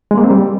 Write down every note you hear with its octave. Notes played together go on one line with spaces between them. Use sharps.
G#3
A#3
C4
G3